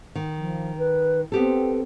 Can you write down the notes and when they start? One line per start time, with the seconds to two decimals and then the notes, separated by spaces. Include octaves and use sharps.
0.15 D#3
0.38 F3
0.78 B4
1.32 B3 C4 G4 A4